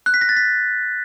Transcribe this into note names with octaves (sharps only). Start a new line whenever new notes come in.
F#6
B6
A#6
A6
B6